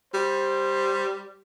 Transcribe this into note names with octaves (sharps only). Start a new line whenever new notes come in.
G3 C5